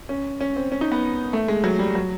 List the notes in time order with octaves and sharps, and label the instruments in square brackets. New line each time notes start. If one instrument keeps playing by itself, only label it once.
[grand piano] C#4
C#4
C4
C#4
D#4
B3
A3
G#3
F#3
G3
F#3